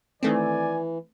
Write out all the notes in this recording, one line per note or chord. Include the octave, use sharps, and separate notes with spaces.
D#3 E3 A3 C4 D5 G#5